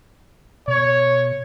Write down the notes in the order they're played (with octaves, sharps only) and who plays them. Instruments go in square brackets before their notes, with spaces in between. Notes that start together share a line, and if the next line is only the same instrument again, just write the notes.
[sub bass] B2 [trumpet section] C#5